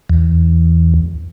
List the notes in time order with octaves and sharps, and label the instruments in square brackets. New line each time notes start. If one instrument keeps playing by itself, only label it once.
[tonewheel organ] E2